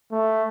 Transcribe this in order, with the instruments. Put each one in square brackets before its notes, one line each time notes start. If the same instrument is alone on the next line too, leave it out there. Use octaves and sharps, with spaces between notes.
[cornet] A3